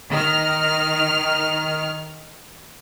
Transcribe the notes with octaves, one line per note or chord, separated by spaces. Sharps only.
D#3 F6